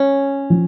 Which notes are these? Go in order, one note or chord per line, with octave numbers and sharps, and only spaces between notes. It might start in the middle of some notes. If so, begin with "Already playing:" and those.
Already playing: C#4
F3